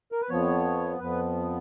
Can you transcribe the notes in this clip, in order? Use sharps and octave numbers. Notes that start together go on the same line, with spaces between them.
A#4
B4
F2 F3 B3 C#5
F2 F3 B3 B4